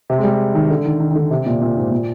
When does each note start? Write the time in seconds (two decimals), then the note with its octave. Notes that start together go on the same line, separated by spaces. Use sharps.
0.10 C3
0.18 G#3
0.24 G3
0.55 D#3
0.70 D3
0.85 D#3
1.00 D#3
1.11 D#3
1.16 D3
1.31 C3
1.46 A#2
1.61 A#2
1.76 G#2
1.92 A#2